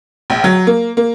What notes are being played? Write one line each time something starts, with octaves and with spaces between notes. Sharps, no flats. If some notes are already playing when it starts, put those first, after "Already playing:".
A#1
F#3
A#3
A#3